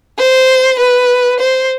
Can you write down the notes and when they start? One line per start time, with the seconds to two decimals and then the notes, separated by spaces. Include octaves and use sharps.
0.19 C5
0.79 B4
1.39 C5